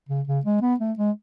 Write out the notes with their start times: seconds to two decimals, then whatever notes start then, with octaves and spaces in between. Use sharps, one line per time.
0.09 C#3
0.27 C#3
0.45 G#3
0.62 B3
0.80 A3
0.98 G#3